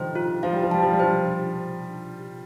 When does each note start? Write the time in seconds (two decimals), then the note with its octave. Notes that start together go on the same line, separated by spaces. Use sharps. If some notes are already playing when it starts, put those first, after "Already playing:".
Already playing: D#3 F3 G3 A3 C5
0.15 F4
0.43 F3 F5
0.53 G3
0.63 F3
0.71 G3 A5
0.83 F3
0.93 G3
0.99 F3 C5